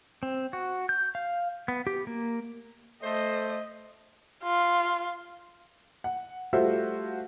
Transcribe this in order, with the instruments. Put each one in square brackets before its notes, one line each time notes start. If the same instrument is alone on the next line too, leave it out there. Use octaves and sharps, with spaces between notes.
[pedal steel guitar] C4
F#4
G6
F5
B3
G4
A#3
[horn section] A3 C5 [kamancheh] D#5
[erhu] F4
[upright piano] F#5
G3 A3 F4 F#4 C5 E5